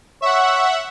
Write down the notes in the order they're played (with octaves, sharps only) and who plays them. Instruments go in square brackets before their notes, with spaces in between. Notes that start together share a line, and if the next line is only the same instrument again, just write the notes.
[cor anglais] C#5 [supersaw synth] E5 F#5